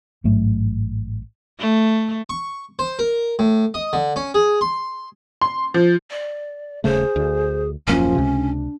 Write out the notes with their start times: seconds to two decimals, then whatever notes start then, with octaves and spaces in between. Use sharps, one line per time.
0.24 A1 G#2 F#3 A3
1.59 A3
2.29 C#6
2.79 C5
2.99 A#4
3.39 A2
3.74 D#5
3.93 D3
4.16 C#4
4.34 G#4
4.61 C6
5.41 C6
5.74 F3
6.10 D5
6.84 D#1 C#3 A3 G#4 C5
7.16 D2
7.87 D#1 F#2 F3 A#3 C#4
8.15 C#2 C3
8.35 D4